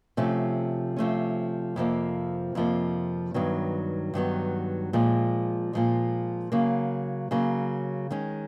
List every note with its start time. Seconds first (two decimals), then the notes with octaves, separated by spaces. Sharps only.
0.17 C3 F3 A3 C#4
0.96 C3 F3 A3 C#4
1.76 F2 C3 F3 A#3
2.55 F2 C3 F3 A#3
3.34 G2 D#3 F#3 B3
4.14 G2 D#3 F#3 B3
4.93 A#2 F3 G#3
5.73 A#2 F3 G#3
6.52 C#3 F#3 A#3
7.31 C#3 F#3 A#3
8.10 D#3 G#3 C#4